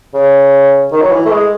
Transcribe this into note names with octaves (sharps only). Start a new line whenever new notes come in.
C#3
D#3
F#3
E3
A3
G#3